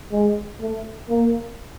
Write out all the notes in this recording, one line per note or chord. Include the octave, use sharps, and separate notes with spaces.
G#3
A3
A#3